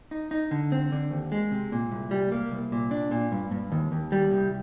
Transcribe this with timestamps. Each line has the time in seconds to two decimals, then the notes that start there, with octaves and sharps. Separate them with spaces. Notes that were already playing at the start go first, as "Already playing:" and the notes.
0.11 D#4
0.31 D#4
0.51 D3
0.72 C4
0.92 D3
1.11 D#2
1.32 G#3
1.51 C3
1.72 A#2
1.91 C2
2.11 G3
2.32 A#3
2.52 C2
2.72 A#2
2.91 D4
3.11 A#2
3.32 G2
3.51 G2
3.72 D#2
3.92 D#2
4.12 G3
4.31 C2